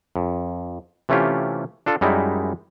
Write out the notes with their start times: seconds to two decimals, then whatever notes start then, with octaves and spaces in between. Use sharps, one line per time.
0.16 F2
1.09 C3 E3 A3 C#4 F4 G4
1.86 D4 F4 A4
2.01 F#2 G3 G#3 D#4 E4